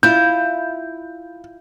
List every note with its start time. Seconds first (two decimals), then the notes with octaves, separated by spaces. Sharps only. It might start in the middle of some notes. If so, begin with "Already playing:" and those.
0.03 E4 F4 G6